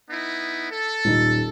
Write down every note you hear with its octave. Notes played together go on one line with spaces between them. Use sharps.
B3 D#4 E4
A4
D#1 A#2 D#4